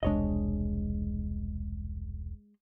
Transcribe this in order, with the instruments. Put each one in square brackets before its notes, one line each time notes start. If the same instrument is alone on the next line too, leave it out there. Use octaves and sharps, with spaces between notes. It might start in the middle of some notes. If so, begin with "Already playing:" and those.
[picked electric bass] E1 C2 D4 [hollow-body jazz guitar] G#3 C#5 D#5